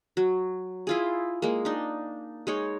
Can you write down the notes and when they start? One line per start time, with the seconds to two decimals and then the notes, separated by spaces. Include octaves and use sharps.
0.17 F#3
0.87 E4 F4 G#4
1.42 G#3 A#3
1.65 D4 D#4
2.47 G#3 D#4 C#5